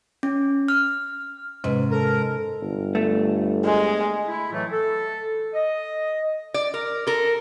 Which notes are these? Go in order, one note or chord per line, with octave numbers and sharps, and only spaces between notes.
C#4
F6
G#2 C3 C#4 B4
A4 A#4
G1
A3
G#3
E4
A2 E3 F#3 A3
A4
D#5
D5
A#4
A4 A#4